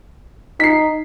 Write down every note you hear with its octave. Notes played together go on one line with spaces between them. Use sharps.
D#4 B6 C7